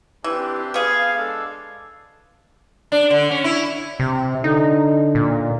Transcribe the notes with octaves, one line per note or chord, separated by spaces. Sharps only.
E3 C4 D4 G4
B3 G#4 F5
G#3 D4 A4
D4
D3
C#4
E4
C3
D3 D#4
A#2